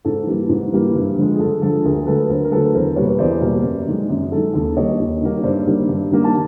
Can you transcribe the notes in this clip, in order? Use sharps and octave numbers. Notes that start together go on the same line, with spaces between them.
G#2 A4
E3 G3 A#3
G#2
E3 G3 A#3
G2
D3 F3 G#3
G#4
G2 A4
D3 F3 G#3 A4
D2 G#4 A#4
D3 F#3 A3 A4 B4
D2 A#4 C5
A#4
D3 F#3 A3 A4 B4
E2 A#4 C5
B2 G3 A#3 B4 C#5
E2 C5 D5
B2 G3 A#3
F#2
D#3 G#3
F#2
D#3 G#3 A4
D#2 A4
D#3 G3 A#3 C#5 D#5
D#2
D#3 G3 A#3
G2 C5 D5
D#3 G3 A#3
G2
D#3 G3 A#3
A5